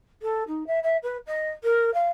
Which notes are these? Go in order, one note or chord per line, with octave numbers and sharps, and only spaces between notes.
A4
D#4
E5
E5
B4
D#5
A#4
F5